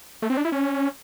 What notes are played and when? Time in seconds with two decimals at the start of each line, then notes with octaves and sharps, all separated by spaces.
0.22 A3
0.30 C4
0.37 D4
0.45 E4
0.52 C#4